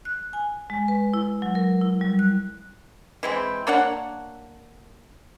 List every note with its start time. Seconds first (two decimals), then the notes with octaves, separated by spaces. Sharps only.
0.05 F#6
0.33 G#5
0.70 G#3
0.88 B4
1.14 E4
1.42 F#3
1.55 A#4
1.81 E4
2.01 G3
2.19 F#6
3.23 E3 G#3 C4
3.67 A#3 D4 C#5 F#5